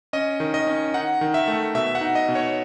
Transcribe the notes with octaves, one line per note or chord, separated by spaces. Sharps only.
C#4 D#5
D#3
D#5
C#4
D#4 F#5
D#3
E5
A3
B2 E5
F#5
D#4
D#5
B2
C#5